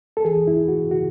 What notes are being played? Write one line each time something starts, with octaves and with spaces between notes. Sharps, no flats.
A4
E3 G#4
E4
E2
F#4
C#3 F#4